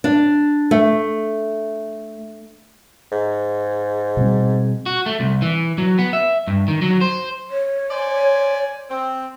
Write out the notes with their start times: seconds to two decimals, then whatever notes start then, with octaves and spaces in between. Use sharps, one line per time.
0.04 D4
0.71 A3
3.11 G#2
4.17 B2 G3 C4
4.86 F#4
5.06 A3
5.20 C2
5.42 E3
5.78 F#3
5.99 B3
6.13 E5
6.47 G2
6.68 D#3
6.82 F#3
7.01 C5
7.50 C#5
7.90 C5 D5 G#5
8.89 C4